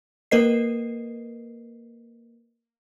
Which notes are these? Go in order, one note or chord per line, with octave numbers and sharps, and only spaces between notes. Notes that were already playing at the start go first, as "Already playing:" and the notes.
A#3 A#4 B4 D#5 C7